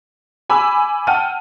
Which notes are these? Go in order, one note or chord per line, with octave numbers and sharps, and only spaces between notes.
G#5 B5 D6 E6
F#5 G5 A5 F6 D#7